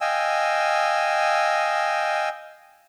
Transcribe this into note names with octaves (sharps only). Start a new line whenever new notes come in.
D#5 F5 G5 G#5 E6